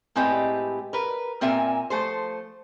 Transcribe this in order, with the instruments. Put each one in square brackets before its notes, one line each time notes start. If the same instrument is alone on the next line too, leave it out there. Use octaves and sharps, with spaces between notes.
[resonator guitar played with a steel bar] A2 G#3 C4 G4 B4 D#5
A#4 B4
A#2 C4 A#4 E5 G#5
F3 A3 A4 C5